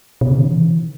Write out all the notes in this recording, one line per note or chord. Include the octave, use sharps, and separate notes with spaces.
B2
C#3
D#3
E3
D#3